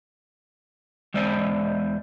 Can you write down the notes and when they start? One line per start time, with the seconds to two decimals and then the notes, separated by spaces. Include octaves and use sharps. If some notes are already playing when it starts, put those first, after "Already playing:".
1.14 E2 G#3 C5 D5